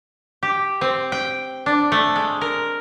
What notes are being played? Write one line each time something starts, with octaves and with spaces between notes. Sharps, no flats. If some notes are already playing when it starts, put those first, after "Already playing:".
G4
C4
G5
D4
A3
G#3
A#4